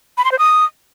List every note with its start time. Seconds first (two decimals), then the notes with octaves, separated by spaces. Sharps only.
0.18 B5
0.25 C6
0.32 C5
0.39 D#6